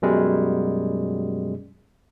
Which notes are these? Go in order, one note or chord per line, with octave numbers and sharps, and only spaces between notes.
F#2 B2 G3 G#3